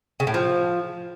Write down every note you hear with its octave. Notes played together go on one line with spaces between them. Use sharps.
C#3
A2
F3